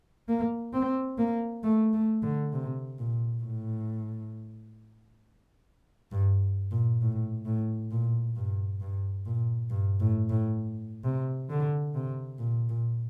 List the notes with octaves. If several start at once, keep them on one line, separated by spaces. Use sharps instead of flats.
A#3
C4
A#3
A3
A3
D3
C3
A#2
A2
G2
A#2
A2
A2
A#2
G2
G2
A#2
G2
A2
A2
C3
D3
C3
A#2
A#2